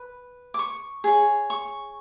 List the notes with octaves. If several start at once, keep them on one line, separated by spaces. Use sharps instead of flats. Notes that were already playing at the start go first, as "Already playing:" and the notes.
Already playing: B4
D6
C#6
G#4 C#5
C#6